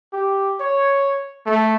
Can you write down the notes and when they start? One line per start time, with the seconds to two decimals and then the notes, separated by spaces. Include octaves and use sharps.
0.13 G4
0.60 C#5
1.46 A3